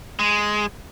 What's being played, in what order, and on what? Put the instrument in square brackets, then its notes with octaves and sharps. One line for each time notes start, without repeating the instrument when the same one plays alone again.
[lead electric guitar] G#3